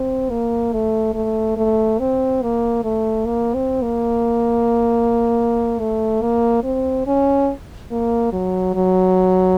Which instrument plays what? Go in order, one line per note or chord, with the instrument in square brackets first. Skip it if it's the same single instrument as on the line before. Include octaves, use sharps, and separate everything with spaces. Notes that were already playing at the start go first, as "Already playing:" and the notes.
Already playing: [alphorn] C4
A#3
A3
A3
A3
C4
A#3
A3
A#3
C4
A#3
A3
A#3
C4
C#4
A#3
F#3
F#3